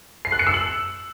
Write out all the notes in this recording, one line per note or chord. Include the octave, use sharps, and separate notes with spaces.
C7
F#6
C#7
E6
F#7